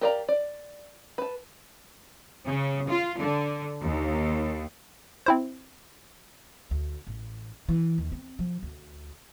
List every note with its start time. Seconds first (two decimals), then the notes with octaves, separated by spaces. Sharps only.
0.01 G4 A#4 D5 F5 A#5
0.29 D5
1.18 B4 A5
2.45 C#3
2.88 F4
3.18 D3
3.81 D#2
5.26 C4 E4 C5
6.71 D2
7.07 A1
7.68 E3
7.98 D#2
8.12 C4
8.39 F3
8.63 D2